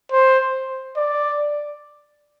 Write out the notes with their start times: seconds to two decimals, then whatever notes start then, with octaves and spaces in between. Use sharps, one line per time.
0.12 C5
0.97 D5